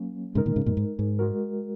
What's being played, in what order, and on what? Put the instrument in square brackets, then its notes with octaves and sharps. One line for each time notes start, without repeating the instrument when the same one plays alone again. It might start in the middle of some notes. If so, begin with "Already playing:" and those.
Already playing: [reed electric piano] F#3 A#3 C#4
[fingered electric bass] G#2 C#3 [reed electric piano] G#3 D#4 A#4
[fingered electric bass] A#2 D#3
G#2 C#3
F#2 A#2
G#2
G#2
[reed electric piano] G#3 F#4 A#4